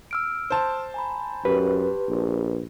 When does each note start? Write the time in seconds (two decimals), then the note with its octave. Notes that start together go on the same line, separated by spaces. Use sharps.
0.11 E6 F6 D7
0.50 C5 A5
0.94 G#5 A#5 B5
1.45 F#2 G4 B4
2.08 A#1